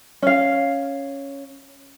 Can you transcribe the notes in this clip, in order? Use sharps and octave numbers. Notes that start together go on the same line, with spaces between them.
C#4 F5